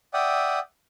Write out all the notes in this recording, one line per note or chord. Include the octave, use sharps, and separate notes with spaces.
D5 E5 F#5 G5 D#6